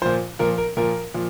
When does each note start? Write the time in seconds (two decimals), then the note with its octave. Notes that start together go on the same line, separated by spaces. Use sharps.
0.02 A#2 F3 C5
0.39 A#2 F3 A#4
0.58 A#4
0.77 A#2 F3 A#4
1.14 A#2 F3